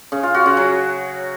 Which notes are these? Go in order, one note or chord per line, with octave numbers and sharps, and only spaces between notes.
C#3
F4
F#4
C#3
F#3